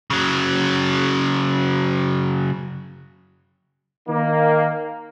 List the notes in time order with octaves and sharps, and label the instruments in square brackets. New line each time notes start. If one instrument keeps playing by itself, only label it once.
[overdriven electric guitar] C#3 F#3
[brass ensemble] D#3 A#3